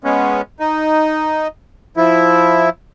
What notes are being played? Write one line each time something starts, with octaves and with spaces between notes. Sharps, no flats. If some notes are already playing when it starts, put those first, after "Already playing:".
G#3 B3 C#4
D#4
F3 E4